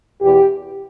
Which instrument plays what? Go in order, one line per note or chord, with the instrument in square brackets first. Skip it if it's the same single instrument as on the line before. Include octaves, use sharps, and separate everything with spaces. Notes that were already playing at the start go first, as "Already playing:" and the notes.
[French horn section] E2 B2 G4